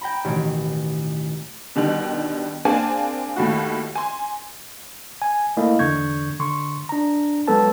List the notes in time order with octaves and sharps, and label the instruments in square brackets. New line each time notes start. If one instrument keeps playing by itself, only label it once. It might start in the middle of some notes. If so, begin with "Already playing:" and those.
[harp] G5 A#5 B5
A1 B2 D#3 D7
[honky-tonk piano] B2 D3 D#3 G3
A#3 C4 D4 G#4 G#5 A5
D#2 A2 F#4
G#5 C6
[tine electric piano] G#5
A3 A#3 E4 D#5
E2 D3 C#6 G6 G#6
D3 C6 C#6
D4 A#5
F#3 G#3 B3 A4 B4 A5